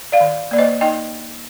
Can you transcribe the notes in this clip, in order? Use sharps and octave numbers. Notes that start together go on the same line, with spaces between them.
D5 F5
D#3
A#3 D5
C5 D#5
D#4 D#5 G5